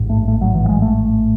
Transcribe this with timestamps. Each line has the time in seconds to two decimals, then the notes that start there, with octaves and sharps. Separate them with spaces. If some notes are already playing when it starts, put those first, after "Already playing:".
Already playing: A1 G#2
0.10 A3
0.28 A3
0.41 F#3
0.55 E3
0.64 F#3
0.69 G#3
0.82 A3